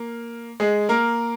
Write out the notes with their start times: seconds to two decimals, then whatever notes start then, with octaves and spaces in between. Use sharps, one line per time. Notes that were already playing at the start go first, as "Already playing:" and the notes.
Already playing: A#3
0.60 G#3 G#4
0.89 A#3 A#4